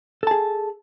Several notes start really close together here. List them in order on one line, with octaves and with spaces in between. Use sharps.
A4 A5 G#4